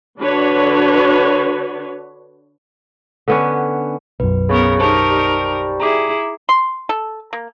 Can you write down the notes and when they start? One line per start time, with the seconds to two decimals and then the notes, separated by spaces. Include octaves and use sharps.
0.19 D3 D4 F#4 B4 C#5
3.28 D3 B3 C#4
4.20 B1 F#2 B4
4.49 C#3 B3 A#4 B5 C#6
4.79 D#4 G4 A#4 C5 A5 C#6
5.11 G3
5.80 E4 G#4 A#5 D6
6.49 C6
6.89 A4
7.33 A#3